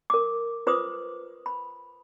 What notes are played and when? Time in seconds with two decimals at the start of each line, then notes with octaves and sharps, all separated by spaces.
0.10 A#4 D6
0.67 F4 B4 C5 D6 D#6
1.46 B5